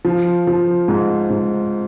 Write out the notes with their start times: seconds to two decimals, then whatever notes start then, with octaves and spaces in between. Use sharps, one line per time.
0.05 F3
0.47 F3
0.88 G#2
1.30 G#2